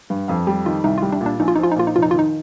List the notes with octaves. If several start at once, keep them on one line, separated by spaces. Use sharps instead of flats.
G2
F2 F5
G3 G4
D#3 F4
C2 D#4
G3 F4
D4
A#2
D4
A#1 D#4
F4
D#4
F3 F4
D#4
A#2 F4
D#4
F1 F4
D#4
D#3 F4
D#4